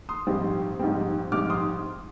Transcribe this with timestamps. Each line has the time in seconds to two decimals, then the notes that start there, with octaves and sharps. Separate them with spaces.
0.09 C6 D#6
0.27 A#1 G#2 G3 C4
0.79 A#1 G#2 G3 C4
1.32 A#1 G#2 G3 C4 D6 F6
1.50 C6 D#6